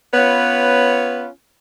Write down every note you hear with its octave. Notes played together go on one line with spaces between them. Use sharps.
B3 C#4 F4 B4 C#5